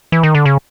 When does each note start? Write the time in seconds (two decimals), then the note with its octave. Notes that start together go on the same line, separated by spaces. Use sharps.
0.12 E3
0.23 D#3
0.35 D3
0.45 C#3